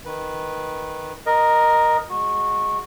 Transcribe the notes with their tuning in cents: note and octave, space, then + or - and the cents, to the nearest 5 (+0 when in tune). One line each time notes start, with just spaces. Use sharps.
D#3 +0 B4 -5
A#4 +10 D#5 -10
G#3 +0 F#4 -20